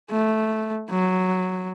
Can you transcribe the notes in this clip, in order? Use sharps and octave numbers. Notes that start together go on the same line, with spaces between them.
A3
F#3